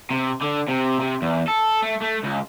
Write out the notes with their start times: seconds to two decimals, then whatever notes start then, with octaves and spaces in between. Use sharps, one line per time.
0.10 C3
0.42 D3
0.69 C3
1.00 C3
1.22 E2
1.48 A4
1.82 A3
2.02 A3
2.24 C#2